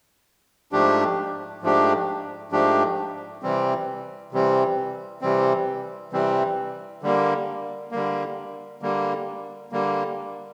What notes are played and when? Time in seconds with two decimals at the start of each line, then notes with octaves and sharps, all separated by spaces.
0.72 G#2 F3 A3 D4 G4
1.63 G#2 F3 A3 D4 G4
2.52 G#2 F3 A3 D4 G4
3.43 C3 E3 G3 C4
4.32 C3 E3 G3 C4
5.22 C3 E3 G3 C4
6.12 C3 E3 G3 C4
7.02 D3 G3 A#3
7.92 D3 G3 A#3
8.82 D3 G3 A#3
9.72 D3 G3 A#3